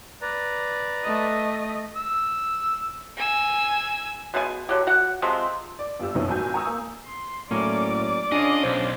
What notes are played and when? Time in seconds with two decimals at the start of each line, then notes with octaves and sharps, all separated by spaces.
0.22 B4 D5 A#5
1.03 A3 D#5
1.96 E6
3.17 G#5 E6
4.34 B2 G#3 E4 G#5
4.69 D3 F#3 G4
4.87 F#4 F#5
5.22 C3 F3 G#3 C4
5.79 D5
6.00 G1 F4 G4 E6
6.14 F#1 C2 B2 D#3 F3 C#4
6.28 G#1 F3 F#4 G#5 G6
6.54 G#5 A#5 C#6 D#6 E6
6.67 A#3
7.05 C6
7.51 A2 F#3 A#3 C#4 D5 D6
8.32 C#4 D4 F4 G#4 D#5
8.63 B1 C5